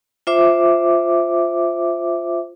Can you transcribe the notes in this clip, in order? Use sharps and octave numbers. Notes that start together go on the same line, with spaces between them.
F4 C5 E5 D6